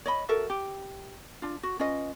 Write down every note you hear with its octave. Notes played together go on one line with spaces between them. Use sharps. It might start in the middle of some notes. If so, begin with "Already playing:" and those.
C#5 D#5 B5
F#4 A4 A#4 E5
G4
D4 F4
F#4
C#4 F4 B4 D#5